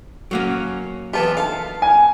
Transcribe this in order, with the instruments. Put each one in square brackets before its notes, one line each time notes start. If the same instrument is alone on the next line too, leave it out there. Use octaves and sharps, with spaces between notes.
[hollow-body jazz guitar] F#3 A#3 C#4
[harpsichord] E3 B3 F4 [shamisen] G4 A5
[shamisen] D3 D#3 A5 [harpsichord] F5
[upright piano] G#5